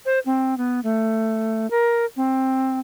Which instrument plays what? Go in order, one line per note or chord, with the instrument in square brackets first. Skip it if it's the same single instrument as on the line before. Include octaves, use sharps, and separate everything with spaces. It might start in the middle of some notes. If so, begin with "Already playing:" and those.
[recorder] C5
C4
B3
A3
A#4
C4